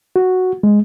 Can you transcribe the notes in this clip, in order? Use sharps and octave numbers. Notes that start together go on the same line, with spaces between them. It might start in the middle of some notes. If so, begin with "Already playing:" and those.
F#4
G#3